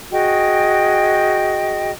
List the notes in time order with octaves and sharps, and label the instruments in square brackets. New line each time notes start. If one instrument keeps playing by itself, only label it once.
[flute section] F#4 G#4 D#5 G5